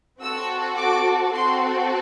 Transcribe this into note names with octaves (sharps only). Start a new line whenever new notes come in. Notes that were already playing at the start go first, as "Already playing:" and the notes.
C4 F#4 A4 E6
D6
C4 F#4 A4 C6